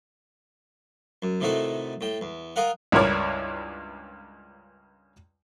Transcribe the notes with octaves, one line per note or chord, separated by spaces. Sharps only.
F#2
A2 C3 D#3 A3 E4 F#4
A2 G5
E2
F4 A#4 D#5 F5 F#5
C#2 G2 E4 A#4 C#5 D5